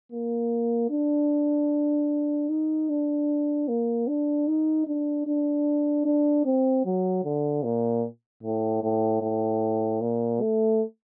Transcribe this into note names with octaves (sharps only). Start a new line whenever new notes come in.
A#3
D4
D#4
D4
A#3
D4
D#4
D4
D4
D4
C4
F#3
D3
A#2
A2
A2
A2
A#2
A3